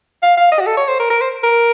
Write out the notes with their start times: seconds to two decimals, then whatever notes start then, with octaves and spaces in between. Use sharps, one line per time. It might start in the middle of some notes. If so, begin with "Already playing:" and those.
0.23 F5
0.38 F5
0.52 D#5
0.60 F#4
0.67 A4
0.78 C#5
0.88 C5
1.00 A#4
1.11 A#4
1.21 C5
1.44 A#4